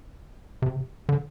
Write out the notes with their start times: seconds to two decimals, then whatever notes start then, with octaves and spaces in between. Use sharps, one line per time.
0.62 C3
1.09 D3